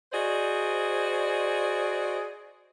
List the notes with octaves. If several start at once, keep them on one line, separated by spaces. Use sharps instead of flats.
F#4 G#4 C5 D5 D#5